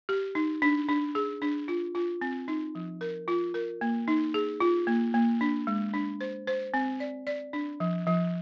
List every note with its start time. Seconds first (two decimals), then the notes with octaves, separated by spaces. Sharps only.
0.09 G4
0.35 D#4
0.62 D4
0.88 D4
1.15 G#4
1.42 D4
1.68 F4
1.95 F4
2.21 C4
2.48 D#4
2.75 F3
3.01 A#4
3.28 F4
3.54 A#4
3.81 A#3
4.08 D#4
4.34 G#4
4.60 F4
4.87 A#3
5.14 A#3
5.41 D4
5.67 G#3
5.94 D4
6.21 C5
6.47 C5
6.74 C4
7.00 D5
7.27 D5
7.53 D4
7.80 F3
8.07 F3